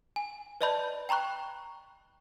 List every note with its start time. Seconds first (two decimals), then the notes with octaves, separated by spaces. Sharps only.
0.16 G#5
0.61 B4 D5 D#5 A5 B5 G6
1.09 G5 A#5 B5 C#6 F#6